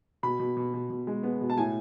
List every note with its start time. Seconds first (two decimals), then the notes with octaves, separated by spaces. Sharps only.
0.23 B2 B5
0.39 B2
0.57 B2
0.74 B2
0.90 B2
1.07 G#3
1.23 B3
1.41 B2
1.50 A5
1.58 A2 G#5